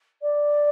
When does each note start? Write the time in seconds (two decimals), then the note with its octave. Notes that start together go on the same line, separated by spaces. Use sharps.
0.22 D5